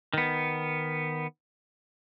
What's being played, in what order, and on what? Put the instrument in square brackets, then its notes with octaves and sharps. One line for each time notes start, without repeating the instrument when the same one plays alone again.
[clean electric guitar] D#3 B3